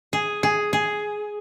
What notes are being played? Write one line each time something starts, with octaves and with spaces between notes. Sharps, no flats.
G#4
G#4
G#4